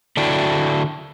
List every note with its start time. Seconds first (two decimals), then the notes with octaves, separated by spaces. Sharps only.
0.17 D3 D4 E4 F#4 G5